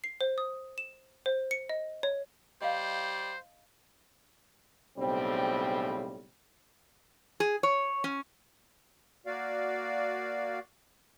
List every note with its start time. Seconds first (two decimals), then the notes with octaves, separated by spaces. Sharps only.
0.04 C7
0.21 C5
0.38 D#6
0.78 E7
1.26 C5
1.51 C#7
1.69 D#5
2.03 C#5
2.62 G3 C5 D#5 F5
4.98 B1 A2 C#3 G3 C4
7.40 G#4
7.63 C#5
8.04 C#4
9.26 A#3 F#4 D5 F5